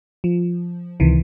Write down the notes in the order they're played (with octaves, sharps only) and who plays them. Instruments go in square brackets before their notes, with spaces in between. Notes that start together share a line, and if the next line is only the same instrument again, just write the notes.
[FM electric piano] F3
C#2 C3 D#3 E3